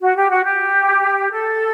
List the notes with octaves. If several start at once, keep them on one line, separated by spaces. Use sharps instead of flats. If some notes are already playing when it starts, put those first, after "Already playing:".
F#4
G4
F#4
G4
A4